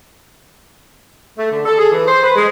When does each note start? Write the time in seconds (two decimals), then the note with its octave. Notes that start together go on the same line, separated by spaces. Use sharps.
1.38 A3
1.52 D3
1.66 A4
1.79 G#4
1.92 E3
2.07 C5
2.23 B4
2.36 G#3